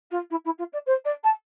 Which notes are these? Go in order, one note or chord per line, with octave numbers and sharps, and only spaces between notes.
F4
E4
E4
F4
D5
C5
D5
A5